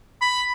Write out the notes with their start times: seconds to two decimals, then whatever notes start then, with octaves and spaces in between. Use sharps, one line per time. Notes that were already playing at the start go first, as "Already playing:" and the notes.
0.21 B5